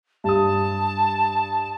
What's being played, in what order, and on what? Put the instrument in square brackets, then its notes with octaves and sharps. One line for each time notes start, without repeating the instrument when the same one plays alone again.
[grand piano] G2 D#6 [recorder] A5